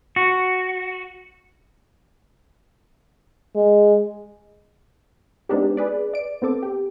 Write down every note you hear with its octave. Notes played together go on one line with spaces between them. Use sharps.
F#4
G#3
G#3 B3 C4 D4 D#4 G4
G#4 B4 D5
D5 D7
B3 C4 A4 D6
G4